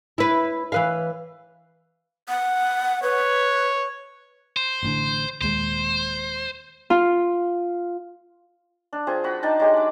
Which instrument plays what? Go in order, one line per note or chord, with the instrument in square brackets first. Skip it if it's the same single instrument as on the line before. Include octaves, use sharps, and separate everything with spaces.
[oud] E4 B4
E3 B4 F5
[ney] F#5
[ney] B4 [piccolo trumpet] C#5
[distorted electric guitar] C5
[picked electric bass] A1 A2 D3
[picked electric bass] D#1 D#2 G#3 [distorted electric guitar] C5
[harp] F4
[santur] D4
F3 C4 G#4
F#4 B5
D4 D#4 G5 A5
F#3 G#3 G4 G#4
B5 D6